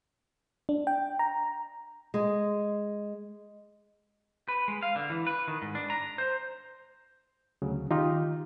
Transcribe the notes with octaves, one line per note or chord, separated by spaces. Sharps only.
D4
G5
A#5
G#3
B4
G#3
F5
D3
E3
B4
D#3
G#2
D4
A#5
C5
D2 C#3 F#3
D#3 D#4 F4 G4